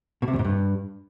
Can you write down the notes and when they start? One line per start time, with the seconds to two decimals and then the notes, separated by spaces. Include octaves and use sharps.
0.22 B2
0.28 C3
0.33 E2
0.39 G#2
0.45 G2